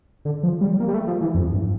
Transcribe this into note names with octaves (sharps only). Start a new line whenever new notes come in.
D3
F3
G3
A#3
G3
A3
F3
E3
F2
G2